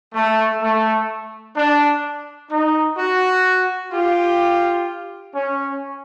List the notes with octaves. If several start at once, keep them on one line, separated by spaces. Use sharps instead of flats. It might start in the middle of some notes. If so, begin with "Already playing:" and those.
A3
A3
D4
D#4
F#4
F4 G4
C#4